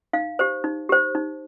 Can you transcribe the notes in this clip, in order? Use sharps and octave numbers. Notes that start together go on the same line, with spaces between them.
D#4 F5
G4 C5
D#4
G4 C5
D#4